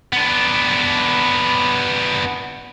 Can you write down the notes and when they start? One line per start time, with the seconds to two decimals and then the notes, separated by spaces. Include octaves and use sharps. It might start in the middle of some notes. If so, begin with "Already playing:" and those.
0.13 B3 D4